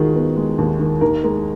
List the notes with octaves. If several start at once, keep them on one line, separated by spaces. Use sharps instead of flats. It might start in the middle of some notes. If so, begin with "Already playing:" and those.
Already playing: D#2 D#3 G#3 F4 F#4 G#4
B3
G#3
D#2
D#3
D#2 A#4
G#3 A#4